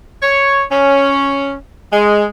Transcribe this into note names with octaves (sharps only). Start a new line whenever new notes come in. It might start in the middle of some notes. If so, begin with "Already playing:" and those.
C#5
C#4
G#3